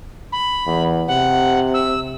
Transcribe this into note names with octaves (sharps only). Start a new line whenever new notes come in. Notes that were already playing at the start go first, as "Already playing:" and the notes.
B5
E2
C3 F#5
E6